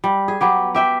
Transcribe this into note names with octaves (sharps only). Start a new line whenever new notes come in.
G3
G#4
F#3 B3 G4
G4 E5 G5